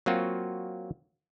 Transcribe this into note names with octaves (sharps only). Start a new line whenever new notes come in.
F#3 A#3 C4 F4 F#4